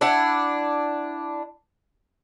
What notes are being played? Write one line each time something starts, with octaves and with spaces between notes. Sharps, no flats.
D4 E4 F#5